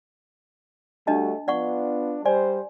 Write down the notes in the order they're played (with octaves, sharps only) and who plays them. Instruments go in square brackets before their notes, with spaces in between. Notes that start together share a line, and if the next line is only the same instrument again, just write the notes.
[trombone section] G3 A3 F#4 [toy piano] D4 D#5 A5
[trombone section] B3 D4 F4 [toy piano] D5 F#5 C#6
[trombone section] G3 C5 [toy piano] D5 G#5